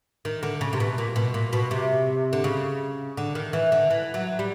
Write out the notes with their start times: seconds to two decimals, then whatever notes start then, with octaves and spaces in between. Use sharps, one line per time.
0.25 D#3
0.43 D3
0.61 C#3
0.73 C3
0.80 B2
0.98 A#2
1.16 B2
1.34 A#2
1.53 B2
1.71 C3
2.33 D3
2.44 C#3
3.17 D3
3.35 D#3
3.53 E3
3.72 D3
3.90 E3
4.14 F#3
4.39 G3